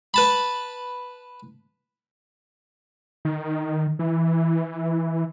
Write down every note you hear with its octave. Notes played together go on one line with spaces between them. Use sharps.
B4 A5 B5
D#3
E3